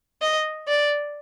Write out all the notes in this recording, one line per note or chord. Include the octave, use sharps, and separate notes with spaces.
D#5
D5